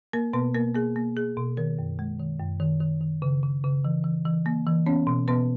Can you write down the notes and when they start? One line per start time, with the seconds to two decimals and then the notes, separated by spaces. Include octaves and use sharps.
0.13 A#3 A#4
0.33 B2 B3 B4
0.55 A#3 A#4
0.75 A#3 G#4
0.96 A#3
1.16 A#3 G#4
1.37 B2
1.57 D#3 A#4
1.79 F#2
1.99 G#3
2.19 D#3
2.40 F#2
2.60 D#3
2.80 D#3
3.01 D#3
3.22 C#3
3.43 C#3
3.64 C#3
3.85 E3
4.04 E3
4.25 E3
4.46 A#3
4.66 E3
4.86 B3 C#4 C#5
5.07 B2
5.28 B2 B3 B4